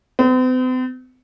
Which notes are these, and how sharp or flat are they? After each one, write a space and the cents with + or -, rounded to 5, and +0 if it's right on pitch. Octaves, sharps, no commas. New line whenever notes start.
C4 -45